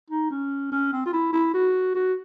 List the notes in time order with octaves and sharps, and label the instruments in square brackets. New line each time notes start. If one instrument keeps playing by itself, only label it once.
[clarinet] D#4
C#4
C#4
C4
F4
E4
E4
F#4
F#4